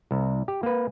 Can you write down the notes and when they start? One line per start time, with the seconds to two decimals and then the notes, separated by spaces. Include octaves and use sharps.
0.11 C2
0.48 G4
0.63 A#3 B4